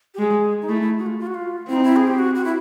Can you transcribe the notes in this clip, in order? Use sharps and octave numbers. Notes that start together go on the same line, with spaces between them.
G4
G#3 G#4
D#4
A3 E4
E4
F#4
F4
F4
F#4
F4
C4 E4
D#4
E4
G#4
G4
F#4
F#4
E4